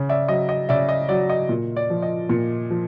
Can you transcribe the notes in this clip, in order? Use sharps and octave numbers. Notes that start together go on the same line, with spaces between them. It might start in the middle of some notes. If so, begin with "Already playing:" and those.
Already playing: C#3
D5 E5
F#3 D#5
D#5
C#3 D5 E5
D#5
F#3 D5
D#5
A#2
D5
F3
D#5
A#2
F3